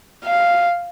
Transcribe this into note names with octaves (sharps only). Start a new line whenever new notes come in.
F5